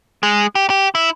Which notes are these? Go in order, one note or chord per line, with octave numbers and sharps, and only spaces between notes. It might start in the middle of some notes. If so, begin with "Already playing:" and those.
G#3
G4
G4
E4